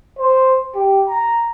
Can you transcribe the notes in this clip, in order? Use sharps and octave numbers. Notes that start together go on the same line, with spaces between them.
C5
G4
A#5